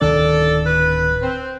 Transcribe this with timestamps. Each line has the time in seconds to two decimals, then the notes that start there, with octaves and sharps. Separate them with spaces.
0.02 D1 D#3 D4 A4 D5
0.66 B4
1.22 C4